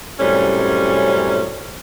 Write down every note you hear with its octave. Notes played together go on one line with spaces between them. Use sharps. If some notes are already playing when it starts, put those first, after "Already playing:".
F#2 A2 C3 G3 C#4